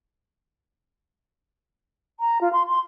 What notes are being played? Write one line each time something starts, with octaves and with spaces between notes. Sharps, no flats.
A#5
F4
C6
C6